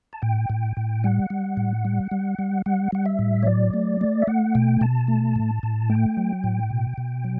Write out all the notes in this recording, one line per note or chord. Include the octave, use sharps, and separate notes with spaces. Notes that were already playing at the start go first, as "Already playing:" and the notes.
A5
A2 G5
A2
A2
G3 F#5
G3
A2
G3
G3
G3
G3 F#5
G3 F#5
E5
A2
C#5
F#3 D5
A3
A3
E5
A3 F#5
B2 G5
B2 A5
A3
A2
A2
A3 G5
F#3
A2
B2
B2
F#3